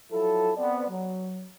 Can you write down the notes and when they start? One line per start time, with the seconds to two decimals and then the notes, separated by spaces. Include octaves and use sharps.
0.11 F3 F#3 E4 A4
0.56 B3 C4 D5
0.88 F#3